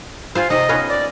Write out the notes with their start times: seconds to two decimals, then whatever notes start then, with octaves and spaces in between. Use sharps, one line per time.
0.35 F4 C5 F5 G#5
0.50 C3 D#4 D#5
0.69 B3 C#4 F4
0.88 D5